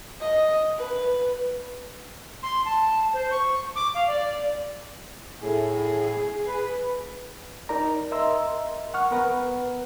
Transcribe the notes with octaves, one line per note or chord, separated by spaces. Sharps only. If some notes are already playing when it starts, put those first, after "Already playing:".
D#5
B4
C6
A5
C5
C#6
D6
F5
D5
A2 G#4
B4
D#4 A#4 D5 A#5
A#4 D#5 E5 A#5 C6 E6
F#5 C#6 F6
B3 A#4 B4 F#5